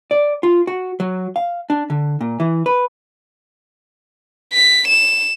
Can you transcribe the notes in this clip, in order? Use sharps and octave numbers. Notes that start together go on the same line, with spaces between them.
D5
F4
F#4
F#3
F5
D4
D3
A#2
E3
B4
B6
E7